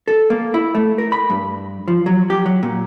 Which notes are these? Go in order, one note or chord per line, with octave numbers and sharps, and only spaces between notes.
A4
A#3
E4
A3
A#4
B5
G2
F3
F#3
G4
F#3
A#2